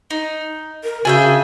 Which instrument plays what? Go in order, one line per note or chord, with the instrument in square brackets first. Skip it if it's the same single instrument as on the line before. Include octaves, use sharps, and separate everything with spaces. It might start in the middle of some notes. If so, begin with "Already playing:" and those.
[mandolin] D#4
[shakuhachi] A#4
[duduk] C#3 [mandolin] D4 E5 G5 [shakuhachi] F#4 [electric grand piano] G#5